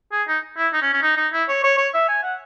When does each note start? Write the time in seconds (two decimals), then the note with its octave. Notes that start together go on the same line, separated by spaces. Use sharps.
0.12 G#4
0.28 D#4
0.58 E4
0.73 D#4
0.82 C#4
0.93 C#4
1.02 D#4
1.17 D#4
1.33 E4
1.49 C#5
1.64 C#5
1.78 C#5
1.94 E5
2.09 G#5
2.23 F#5